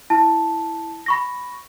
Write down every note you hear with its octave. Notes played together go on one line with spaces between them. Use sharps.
E4 A5
B5 C#6 A#6